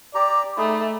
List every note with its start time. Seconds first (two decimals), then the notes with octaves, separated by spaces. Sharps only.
0.15 G4 D5 A#5
0.58 A3 D#4 G#4 B5